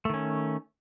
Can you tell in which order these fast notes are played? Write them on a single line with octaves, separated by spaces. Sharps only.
A3 D#3 C#4